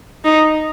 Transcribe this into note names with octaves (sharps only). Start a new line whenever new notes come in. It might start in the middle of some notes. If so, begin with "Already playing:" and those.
D#4